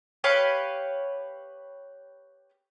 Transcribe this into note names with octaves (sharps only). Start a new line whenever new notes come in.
G4 B4 C#5 F5